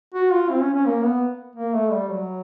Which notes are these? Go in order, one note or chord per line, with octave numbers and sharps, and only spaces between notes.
F#4
F4
C4
C#4
C#4
A#3
B3
A#3
A3
G3
F#3